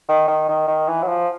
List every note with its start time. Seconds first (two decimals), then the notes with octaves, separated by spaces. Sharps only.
0.09 D#3
0.28 D#3
0.48 D#3
0.68 D#3
0.88 E3
1.03 F#3
1.08 F3